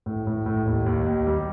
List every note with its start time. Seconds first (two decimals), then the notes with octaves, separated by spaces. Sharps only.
0.06 A2
0.27 A2
0.46 A2
0.66 D#2
0.86 D#2
1.06 D#2
1.27 G3